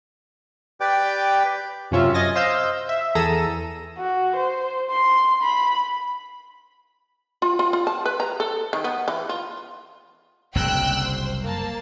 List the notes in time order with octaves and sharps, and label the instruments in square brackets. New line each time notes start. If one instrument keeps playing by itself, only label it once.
[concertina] G4 B4 D5 G5
[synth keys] F#2 C3 C#4 F4 E5
D#5 G#5 A6 A#6
C5 D#5 F5 E6 G6
E5
E2 G#4 A4 A#5 E6 D#7
[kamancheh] F#4
C5
C6
B5
[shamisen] F4
F4
F4
A5
B4
A#5
A4
D#3
B3
E3
F4
[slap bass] F#1 C2 F#2 [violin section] G5 E6 F#6
[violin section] C5
A#3 A5